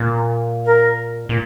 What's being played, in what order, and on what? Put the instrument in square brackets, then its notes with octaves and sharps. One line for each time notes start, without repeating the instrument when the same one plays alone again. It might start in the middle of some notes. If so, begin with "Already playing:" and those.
Already playing: [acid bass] A#2
[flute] A#4
[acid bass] A#2